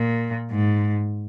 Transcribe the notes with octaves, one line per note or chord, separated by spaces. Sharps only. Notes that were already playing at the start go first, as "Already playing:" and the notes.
Already playing: A#2
G#2